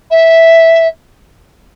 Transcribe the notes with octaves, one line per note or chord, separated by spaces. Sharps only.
E5